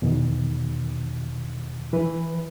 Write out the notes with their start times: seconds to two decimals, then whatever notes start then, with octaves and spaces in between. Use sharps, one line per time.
0.02 E2 B2 D#3
1.93 E3 B4